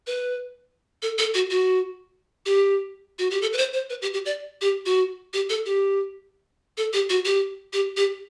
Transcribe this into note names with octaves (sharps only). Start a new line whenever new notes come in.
B4
A4
A4
F#4
F#4
G4
F#4
G4
A4
B4
C5
C5
B4
G4
G4
D5
G4
F#4
G4
A4
G4
A4
G4
F#4
G4
G4
G4